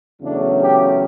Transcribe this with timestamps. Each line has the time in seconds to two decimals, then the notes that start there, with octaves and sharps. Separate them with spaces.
0.22 E2 C#3 F#3 A3 D4
0.61 G4